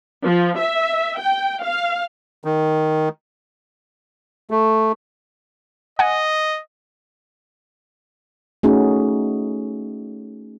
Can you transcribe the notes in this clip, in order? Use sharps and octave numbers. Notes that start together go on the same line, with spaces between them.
F3
E5
G5
F5
D#3
A3
D#5 F#5 G#5
A3 C#4 D#4 F#4 G#4